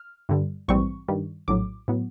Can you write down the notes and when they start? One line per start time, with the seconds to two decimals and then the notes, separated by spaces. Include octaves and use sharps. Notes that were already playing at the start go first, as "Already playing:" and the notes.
Already playing: F6
0.29 G2 D3 G3
0.68 A#1 G#2 E3 G3 C4 C#6
1.08 G2 D#3 G3
1.48 A#1 A2 F#3 D6
1.88 A2 F#3 B3